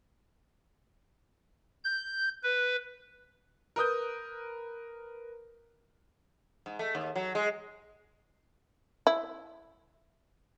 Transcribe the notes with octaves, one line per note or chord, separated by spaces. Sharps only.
G6
B4
A#4 B4 D#6 G6
G#2
A3
D#2
F#3
G#3
E4